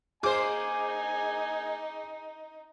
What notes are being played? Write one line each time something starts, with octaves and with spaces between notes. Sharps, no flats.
A#3 D#4 G#4 C5 G#5 D6